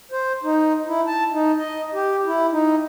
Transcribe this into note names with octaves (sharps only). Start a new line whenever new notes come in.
C5
D#4
E4
A5
D#4
D#5
G4
E4
D#4